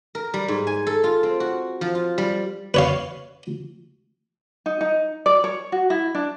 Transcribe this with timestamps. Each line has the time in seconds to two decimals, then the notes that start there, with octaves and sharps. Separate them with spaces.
0.15 A#4
0.34 G3
0.48 G#2
0.67 G#5
0.87 A4
1.04 F4
1.23 C4
1.40 F#4
1.81 F3
1.95 F4
2.18 G3
2.74 B4 C#5 F5
4.66 D#4
4.81 D#4
5.26 D5
5.44 C#5
5.72 F#4
5.90 E4
6.15 D4